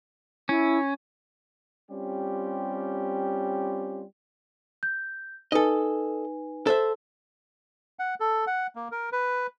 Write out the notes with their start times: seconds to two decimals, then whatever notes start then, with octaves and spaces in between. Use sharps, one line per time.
0.49 C#4 E4
1.91 G3 C4 C#4 F4 G4
4.83 G6
5.52 D#4 A4 B4 D#5 G#5
6.67 A4 C5 E5
7.99 F#5
8.20 A4
8.47 F#5
8.76 A#3
8.92 A#4
9.12 B4